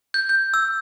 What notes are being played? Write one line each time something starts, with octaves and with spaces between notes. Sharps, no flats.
G6
G6
E6